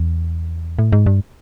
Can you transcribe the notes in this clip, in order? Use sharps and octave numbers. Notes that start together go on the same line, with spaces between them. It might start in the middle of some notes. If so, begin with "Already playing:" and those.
Already playing: E2
A2
G#2
G2